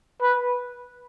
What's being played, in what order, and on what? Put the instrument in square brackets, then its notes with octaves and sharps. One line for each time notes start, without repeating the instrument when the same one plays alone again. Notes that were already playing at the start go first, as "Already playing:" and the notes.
[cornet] B4